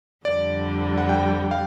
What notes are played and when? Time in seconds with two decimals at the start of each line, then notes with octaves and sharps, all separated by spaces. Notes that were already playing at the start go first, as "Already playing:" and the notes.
0.25 F2 D3 G3 D5
0.98 F#5
1.09 G5
1.51 F5